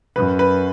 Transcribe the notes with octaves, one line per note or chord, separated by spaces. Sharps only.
F#2 B4
B4